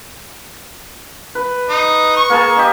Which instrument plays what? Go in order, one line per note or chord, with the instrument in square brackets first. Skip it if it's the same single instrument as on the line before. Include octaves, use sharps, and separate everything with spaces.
[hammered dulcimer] B4
[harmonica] D#4
C#6
[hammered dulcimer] A#3 G#4 A5
G4 D#5